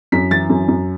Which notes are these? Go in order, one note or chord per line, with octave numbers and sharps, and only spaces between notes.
F#2 B6
E3 A6
F#2
F#2